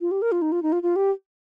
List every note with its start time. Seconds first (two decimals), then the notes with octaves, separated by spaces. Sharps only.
0.01 F4
0.11 G4
0.22 A#4
0.32 F4
0.42 D#4
0.52 F4
0.63 D#4
0.72 F4
0.83 F4
0.96 G4